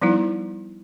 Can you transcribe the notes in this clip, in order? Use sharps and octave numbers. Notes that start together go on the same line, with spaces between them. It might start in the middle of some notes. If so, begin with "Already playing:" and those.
F3 G3 B3 D#4 E4